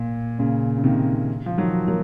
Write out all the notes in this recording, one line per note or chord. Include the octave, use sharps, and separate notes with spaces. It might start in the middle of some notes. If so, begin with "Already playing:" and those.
Already playing: A#2
A#2 C#3
C#3
C3 D#3
F3
D#3 F#3
F#3 A#3